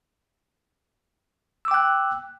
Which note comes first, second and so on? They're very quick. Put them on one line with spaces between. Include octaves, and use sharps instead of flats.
E6 D6 G5 F#6